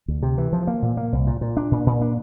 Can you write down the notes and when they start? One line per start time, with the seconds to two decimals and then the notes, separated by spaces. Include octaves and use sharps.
0.08 D2
0.23 C3
0.38 E3
0.53 F3
0.67 A#3
0.82 A#2
0.97 A#3
1.12 C2
1.27 A#2
1.41 A#2
1.57 D4
1.71 A#2
1.86 A#2
2.01 D4